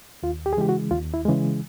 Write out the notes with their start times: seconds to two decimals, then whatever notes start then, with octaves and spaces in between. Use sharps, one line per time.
0.23 D#2 F4
0.46 G4
0.53 G#4
0.57 C#3 E3 G#3 G4
0.69 F#4
0.91 D#2 F4
1.14 E4
1.25 C#3 E3 G#3